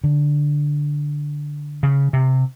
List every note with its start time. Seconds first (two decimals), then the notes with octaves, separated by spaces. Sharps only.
0.04 D3
1.83 C#3
2.13 C3